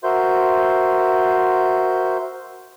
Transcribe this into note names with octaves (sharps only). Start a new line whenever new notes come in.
F#4 A#4 C5 E5 C6 G6